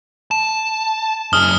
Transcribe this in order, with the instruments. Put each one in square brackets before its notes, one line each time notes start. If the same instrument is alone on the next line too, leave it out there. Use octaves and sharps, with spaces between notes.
[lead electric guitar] A5 [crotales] E7
[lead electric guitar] F#2 G#4 [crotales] D#6 F6 G7